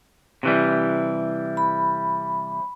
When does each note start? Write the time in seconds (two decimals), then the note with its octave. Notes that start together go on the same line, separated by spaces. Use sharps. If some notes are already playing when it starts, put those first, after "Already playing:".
0.43 C3 E3 G3
1.57 B5